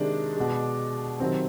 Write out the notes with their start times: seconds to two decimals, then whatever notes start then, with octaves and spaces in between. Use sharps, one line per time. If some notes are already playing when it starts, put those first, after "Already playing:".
Already playing: C3 D#3 G#3 D4
0.37 B2 G#3
1.20 C3 D#3 F#3 C4